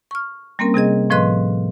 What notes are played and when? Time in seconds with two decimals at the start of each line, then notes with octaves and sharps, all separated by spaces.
0.11 C#6 F6
0.59 G3 A#3 C4 C#4 A#4
0.74 C3 G3 G#4 D#5
1.10 A2 F3 B4 D#5 C6 F#6